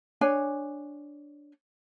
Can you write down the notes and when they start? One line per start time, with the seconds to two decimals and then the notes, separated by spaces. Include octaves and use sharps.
0.21 D4 C#5 G#5